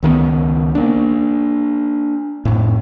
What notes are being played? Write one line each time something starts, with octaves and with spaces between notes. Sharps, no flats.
C#2 D#3 G3 B3
A#3 D4
F2 A2